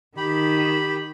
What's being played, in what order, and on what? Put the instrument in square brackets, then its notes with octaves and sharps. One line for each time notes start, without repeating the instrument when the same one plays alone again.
[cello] D#3 [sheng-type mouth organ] G4 B5